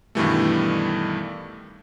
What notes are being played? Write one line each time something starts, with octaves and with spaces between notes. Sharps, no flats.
G2 B2 D#3 E3 G3 A3